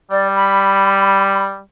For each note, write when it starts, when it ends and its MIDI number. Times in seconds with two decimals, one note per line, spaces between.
0.11 1.60 55
0.11 0.27 74
0.35 1.44 83